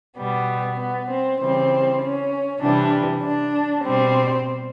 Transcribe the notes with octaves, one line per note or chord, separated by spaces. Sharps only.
B2 G3 B3
B3
C4
C#3 E3 G3 C4
C#4
C3 E3 G3 D4
D4
B2 G3 C4